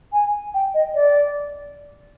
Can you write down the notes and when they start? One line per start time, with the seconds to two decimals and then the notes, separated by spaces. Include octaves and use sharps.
0.13 G#5
0.54 G5
0.74 D#5
0.95 D5